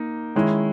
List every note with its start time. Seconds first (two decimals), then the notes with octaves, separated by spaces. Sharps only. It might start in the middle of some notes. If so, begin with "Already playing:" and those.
Already playing: A#3 D#4
0.35 D#3 G#3 C#4 E4